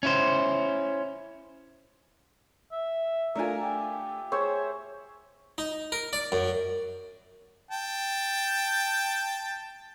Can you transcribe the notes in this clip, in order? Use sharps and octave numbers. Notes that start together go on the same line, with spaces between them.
C#4 E4 C5
E5
A3 D4 F4 A#4 E5 G#5
G4
G#4 C5 C#5 E5
D#4
A#4
D5
F#2
G5 A5